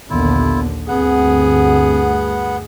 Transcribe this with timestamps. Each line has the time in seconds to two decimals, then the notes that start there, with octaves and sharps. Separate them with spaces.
0.10 A#1 D#2 D3 B3 E4 F4
0.88 D2 G2 B3 C4 G#4 F#5